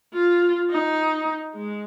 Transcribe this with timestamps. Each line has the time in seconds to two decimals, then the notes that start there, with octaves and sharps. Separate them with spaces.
0.14 F4
0.70 D#4
1.55 G#3